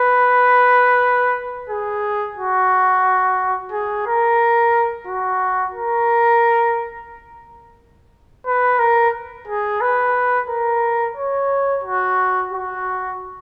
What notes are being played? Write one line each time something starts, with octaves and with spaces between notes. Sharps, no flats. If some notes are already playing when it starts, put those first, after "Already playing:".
Already playing: B4
G#4
F#4
G#4
A#4
F#4
A#4
B4
A#4
G#4
B4
A#4
C#5
F#4
F#4